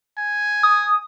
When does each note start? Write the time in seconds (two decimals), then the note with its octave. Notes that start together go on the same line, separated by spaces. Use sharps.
0.18 G#5
0.63 D#6